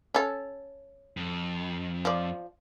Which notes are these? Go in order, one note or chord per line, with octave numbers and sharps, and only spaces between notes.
C#4 A4
F2
F3 D5